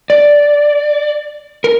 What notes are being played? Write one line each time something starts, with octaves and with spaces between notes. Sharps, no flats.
D5
A#4